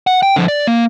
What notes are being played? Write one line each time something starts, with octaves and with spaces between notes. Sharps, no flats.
F#5
G5
D3 F3
D5
A#3